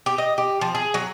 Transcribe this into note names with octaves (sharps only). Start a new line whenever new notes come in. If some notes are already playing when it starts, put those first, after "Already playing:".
G4
D#5
G4
F3
G#4
F#3